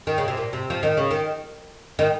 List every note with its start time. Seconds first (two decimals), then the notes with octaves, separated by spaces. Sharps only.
0.07 D#3
0.18 C#3
0.28 C3
0.37 A#2
0.53 C3
0.70 F3
0.83 D#3
0.97 C#3
1.11 D#3
1.99 D#3